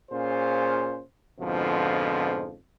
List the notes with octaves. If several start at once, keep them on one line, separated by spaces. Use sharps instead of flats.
A#2 C#4 F4 G#4 C5
F2 G#2 B2 D3 F3